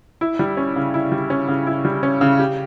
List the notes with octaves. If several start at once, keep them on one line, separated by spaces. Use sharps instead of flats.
E4
G3
C#4
C#3
E4
G3
C#4
C#3
E4
G3
C#4
C#3
G4